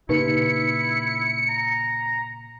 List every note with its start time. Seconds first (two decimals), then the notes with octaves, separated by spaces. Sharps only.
0.09 A#2 C#3 A#3 D#4 E4 G4 B4 C#7
1.49 A#5